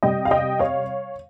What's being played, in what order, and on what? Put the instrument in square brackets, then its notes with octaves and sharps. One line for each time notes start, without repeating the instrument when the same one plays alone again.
[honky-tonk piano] C3 G3 D#5 G5
F5
D#5 G5
C#5 F5